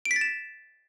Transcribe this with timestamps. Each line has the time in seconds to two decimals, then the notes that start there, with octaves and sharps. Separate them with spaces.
0.05 D7
0.11 B6
0.16 A6
0.21 E7